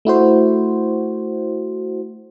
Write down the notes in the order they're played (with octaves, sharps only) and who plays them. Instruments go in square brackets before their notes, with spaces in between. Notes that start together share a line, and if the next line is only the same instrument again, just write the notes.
[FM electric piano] A3 E4 F#4 C5